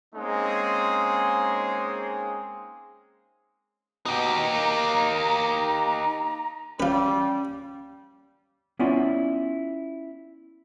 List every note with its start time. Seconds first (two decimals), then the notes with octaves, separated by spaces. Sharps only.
0.15 G#3 A#3 C4 C#4 D#4 G#4
4.06 B2 D#4 G4 A#5
4.54 A#3
6.80 G3 C#4 F4 B4
8.79 B3 C#4 E4 F4 D5 G#5